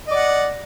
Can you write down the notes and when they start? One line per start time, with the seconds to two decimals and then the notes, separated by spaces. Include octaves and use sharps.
0.08 D#5
0.11 D5
0.15 F#5